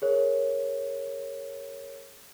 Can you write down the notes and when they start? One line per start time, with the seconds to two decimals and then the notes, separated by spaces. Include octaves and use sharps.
0.02 G#4 A#4 C#5